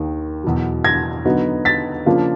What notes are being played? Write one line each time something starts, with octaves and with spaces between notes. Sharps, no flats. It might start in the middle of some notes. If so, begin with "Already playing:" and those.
Already playing: D#2 D#3
E2 B2 F#3
G#6 A#6
D3 F#3 B3 D#4
A6 B6
C#3 F3 A#3 D4 F4